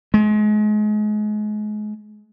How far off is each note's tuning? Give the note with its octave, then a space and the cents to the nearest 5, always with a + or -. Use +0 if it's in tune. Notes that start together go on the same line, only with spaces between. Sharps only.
G#3 +30